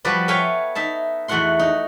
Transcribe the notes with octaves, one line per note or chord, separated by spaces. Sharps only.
F3 G3 B3 F#4 B4 D5
A4 C#5 E5 F5 G5 G#5
D#4 E5 A5
E2 A3 F#4 F#5 C6
D#4